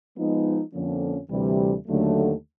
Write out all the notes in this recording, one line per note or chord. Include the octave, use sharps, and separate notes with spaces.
F3 G#3 B3 D#4
F2 D3 F3 A#3 C#4
D2 C3 E3 G3
D#2 D3 F#3 A3